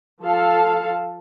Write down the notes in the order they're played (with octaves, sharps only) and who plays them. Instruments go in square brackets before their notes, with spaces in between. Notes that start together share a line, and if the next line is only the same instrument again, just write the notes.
[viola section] F3 A4 F5 A5